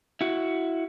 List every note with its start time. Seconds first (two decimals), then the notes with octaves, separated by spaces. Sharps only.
0.21 E4 F#4